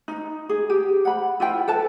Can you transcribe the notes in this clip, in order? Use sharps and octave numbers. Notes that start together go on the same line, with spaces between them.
D#4
G#4
G4
F#5 B5
E4 F4 G5
A4 B4 A5